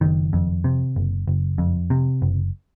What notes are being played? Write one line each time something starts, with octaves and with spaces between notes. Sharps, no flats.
F#1 D#3
F2
C3
F#1
F#1
F2
C3
F#1